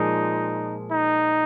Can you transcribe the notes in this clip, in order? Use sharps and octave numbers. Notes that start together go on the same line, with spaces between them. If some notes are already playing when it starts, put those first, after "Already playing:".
Already playing: A#2 F3 G#3 D#4
D#4